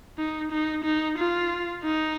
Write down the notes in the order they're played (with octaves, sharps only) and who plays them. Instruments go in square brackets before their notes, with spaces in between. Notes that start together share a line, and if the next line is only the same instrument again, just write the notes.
[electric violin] D#4
D#4
D#4
F4
D#4